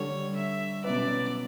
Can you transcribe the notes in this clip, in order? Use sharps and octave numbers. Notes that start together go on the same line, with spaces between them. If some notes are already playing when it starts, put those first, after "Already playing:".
Already playing: D3 G3 D4 A4 C#5 D5
E5
B2 F#3 C#4 E4 B4 D5